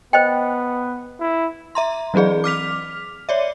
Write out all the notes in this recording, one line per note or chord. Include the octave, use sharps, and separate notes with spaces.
B3 C5 D#5 G5
E4
E5 A#5 C6
E3 F#3 C4 G#4 D5
D6 F6 B6 F7
C#5 D5 E5